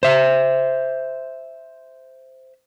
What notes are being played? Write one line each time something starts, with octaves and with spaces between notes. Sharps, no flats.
C5 E5